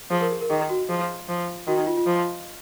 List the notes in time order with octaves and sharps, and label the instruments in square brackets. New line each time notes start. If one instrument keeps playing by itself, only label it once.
[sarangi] F3 [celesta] G#4
[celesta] A#4
G#4
A#4
[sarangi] D#3 [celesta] G#4
[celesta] F#4
[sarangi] F3 [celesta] G#4
[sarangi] F3
[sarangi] D#3 [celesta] F#4
[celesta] D#4
F4
F4
[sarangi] F3